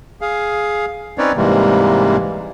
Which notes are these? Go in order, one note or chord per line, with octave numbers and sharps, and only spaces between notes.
G#4 F5
C4 C#4 D#4 B4 C#5 D5
G#2 C3 E3 G3 G#3 A#3